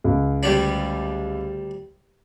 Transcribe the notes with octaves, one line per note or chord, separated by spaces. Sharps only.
C#2
D2 G3 D4